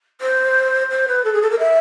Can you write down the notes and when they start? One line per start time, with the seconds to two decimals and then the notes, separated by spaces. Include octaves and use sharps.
0.21 C5
0.90 C5
1.07 B4
1.24 A4
1.33 G#4
1.42 A4
1.50 A#4
1.59 E5